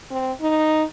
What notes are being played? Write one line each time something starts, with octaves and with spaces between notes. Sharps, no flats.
C4
D#4